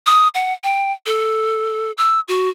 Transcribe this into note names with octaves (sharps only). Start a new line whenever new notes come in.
D#6
F#5
G5
A4
E6
F#4